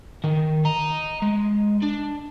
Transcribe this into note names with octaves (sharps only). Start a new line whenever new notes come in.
D#3
D#5 A#5
G#3
D4